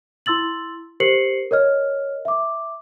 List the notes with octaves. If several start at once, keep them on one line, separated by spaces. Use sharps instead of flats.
E4 C6 E6 A6 F#7
G4 A#4 C5 C7 C#7 F#7
A#4 C#5 D#5 F6
E5 D6